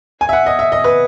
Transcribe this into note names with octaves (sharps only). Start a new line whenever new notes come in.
G#5
E5
F#5
D#5
E5
D#5
B4